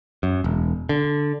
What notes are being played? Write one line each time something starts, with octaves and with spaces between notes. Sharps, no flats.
F#2
E1
D3